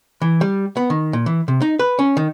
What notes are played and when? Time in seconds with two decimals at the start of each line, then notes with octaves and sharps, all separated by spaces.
0.22 E3
0.41 G3
0.77 B3
0.90 D#3
1.13 A#2
1.26 E3
1.48 C3
1.62 D#4
1.79 B4
1.99 C#4
2.17 D#3